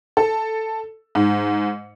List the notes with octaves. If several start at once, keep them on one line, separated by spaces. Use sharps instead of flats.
A4
G#2